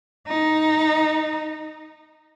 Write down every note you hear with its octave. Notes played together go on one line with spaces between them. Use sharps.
D#4